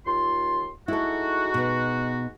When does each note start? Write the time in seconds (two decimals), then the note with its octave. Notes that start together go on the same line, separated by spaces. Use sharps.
0.06 D#2 F4 C6
0.88 G#3 D#4 E4 F#4 A4
1.54 B2 B3